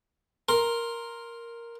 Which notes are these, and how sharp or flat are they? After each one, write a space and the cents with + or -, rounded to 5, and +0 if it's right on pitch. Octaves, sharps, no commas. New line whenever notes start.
A#4 +0 C6 +10